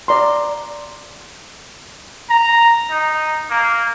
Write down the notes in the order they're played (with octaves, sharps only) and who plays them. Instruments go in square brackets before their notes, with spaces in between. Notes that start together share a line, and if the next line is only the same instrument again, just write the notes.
[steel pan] D5 A#5 C6
[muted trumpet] A#5
D#4
A#3